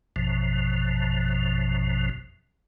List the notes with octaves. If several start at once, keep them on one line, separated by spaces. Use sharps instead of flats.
A1 F#2 B2 F3